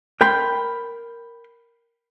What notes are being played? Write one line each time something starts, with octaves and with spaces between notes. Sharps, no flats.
A#4 G5 B5 C6